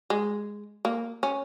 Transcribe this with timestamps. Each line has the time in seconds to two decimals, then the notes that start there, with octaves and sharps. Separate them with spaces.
0.10 G#3
0.85 A#3
1.23 C#4